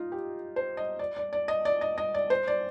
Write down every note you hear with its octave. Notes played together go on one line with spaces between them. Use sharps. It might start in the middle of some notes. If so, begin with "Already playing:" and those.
Already playing: D#4 F4
G4
C5
D#5
D5
D5
D5
D#5
D5
D#5
D#5
D5
C5
D5